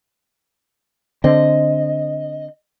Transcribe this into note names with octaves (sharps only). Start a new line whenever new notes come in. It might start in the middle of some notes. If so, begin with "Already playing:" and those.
D3 C4 D#5